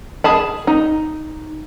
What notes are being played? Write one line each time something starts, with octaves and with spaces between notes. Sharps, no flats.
G#4 A5 B5
D#4